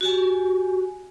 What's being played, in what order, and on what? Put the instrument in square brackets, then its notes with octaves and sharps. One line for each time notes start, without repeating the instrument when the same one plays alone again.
[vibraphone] F#4 G4 G#5